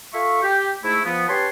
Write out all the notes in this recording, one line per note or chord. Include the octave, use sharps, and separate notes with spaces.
F4 A4 E5 C#6
G4
G#2 A3 E4
F3 B3
C#4 G4 B4 C#5 A5 C6